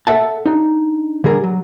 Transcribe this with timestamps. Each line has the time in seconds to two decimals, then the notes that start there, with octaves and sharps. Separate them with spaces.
0.07 A4 C5 E5 F#5 A5
0.46 D4 D#4
1.24 D3 G3 G#4 A#4
1.44 F#3